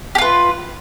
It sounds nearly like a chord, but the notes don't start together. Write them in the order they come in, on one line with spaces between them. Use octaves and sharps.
G4 F4 B4